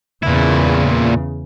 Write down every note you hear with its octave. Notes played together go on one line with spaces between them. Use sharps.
E2 A#2 C#3 E4